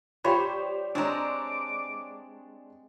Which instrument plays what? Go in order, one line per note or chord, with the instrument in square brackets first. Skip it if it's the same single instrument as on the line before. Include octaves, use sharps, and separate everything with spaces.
[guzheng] G3 [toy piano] F4 F5 G5 [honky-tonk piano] G4 C5 C#5
[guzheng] G#3 C4 [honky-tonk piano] D4 C#5 A#5 [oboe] D6